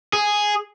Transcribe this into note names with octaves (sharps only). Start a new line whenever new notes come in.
G#4